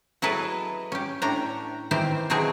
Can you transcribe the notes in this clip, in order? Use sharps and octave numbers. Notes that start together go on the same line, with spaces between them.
F#3 E4 G#4 A4 B4 D#5
C#4 G4
A2 C#4 D4 G5 A#5
D#3 E3 C4 G4 C5
B2 F#3 G#3 C4 D#4 G#4